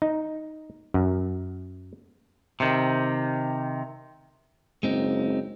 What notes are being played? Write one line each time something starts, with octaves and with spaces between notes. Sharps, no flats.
D#4
F#2
C3 D#3
F#1 G#3 C4 D#4